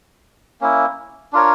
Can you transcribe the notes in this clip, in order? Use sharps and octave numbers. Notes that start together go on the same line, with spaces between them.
A#3 C#4 E4
D4 F4 A#4 C#5